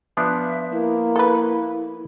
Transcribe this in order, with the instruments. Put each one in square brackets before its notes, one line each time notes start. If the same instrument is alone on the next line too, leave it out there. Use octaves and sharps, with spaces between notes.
[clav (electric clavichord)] F3 B3 D4 [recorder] E5
[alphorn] A#3 [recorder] E4
[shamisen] A4 B4